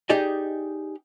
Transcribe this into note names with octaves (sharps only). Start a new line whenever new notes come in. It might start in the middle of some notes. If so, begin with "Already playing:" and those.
D#4 G4 G#4 D5 D#5